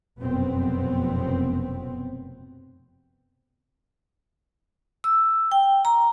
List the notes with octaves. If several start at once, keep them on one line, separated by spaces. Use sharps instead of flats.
F1 F#2 B2 B3 C4
E6
G5
A#5